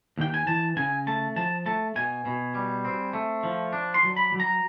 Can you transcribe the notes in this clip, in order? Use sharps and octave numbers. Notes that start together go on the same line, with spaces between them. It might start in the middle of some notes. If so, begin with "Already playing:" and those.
D#2 G5
G#5
E3 A5
C#3 G#5
A3 A5
F3 A5
A3 A5
B2 G#5
B2
G3
C4
A3
F3
D4
C6
F#3
B5
F#3
A#5